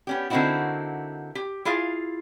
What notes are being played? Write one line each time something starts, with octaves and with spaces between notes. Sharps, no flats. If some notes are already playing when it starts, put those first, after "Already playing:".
B3 C#4 G4
D3 A#3 C4 D#4 E4 F#4
G4
E4 F4 G#4 F5